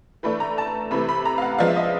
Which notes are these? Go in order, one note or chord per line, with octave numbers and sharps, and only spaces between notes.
E3 A3 D4 B5
A#5
A5
C3 E3 A3 B5
B5
A#5
F5
F#5
F3 G#3 B3 D4 F5
E5
D#5